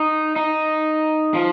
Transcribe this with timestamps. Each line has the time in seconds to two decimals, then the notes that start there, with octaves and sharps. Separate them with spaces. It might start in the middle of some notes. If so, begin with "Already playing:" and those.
Already playing: D#4
0.36 D#4
1.34 F3